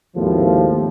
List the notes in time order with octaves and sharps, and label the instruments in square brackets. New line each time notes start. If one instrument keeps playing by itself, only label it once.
[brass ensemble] G#1 D#2 A2 F3